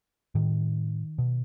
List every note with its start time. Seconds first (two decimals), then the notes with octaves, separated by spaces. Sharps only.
0.35 A2 D#3
1.18 B2